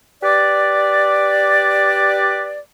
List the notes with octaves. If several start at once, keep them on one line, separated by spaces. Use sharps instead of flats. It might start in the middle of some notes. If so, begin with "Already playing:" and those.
G4 B4 D5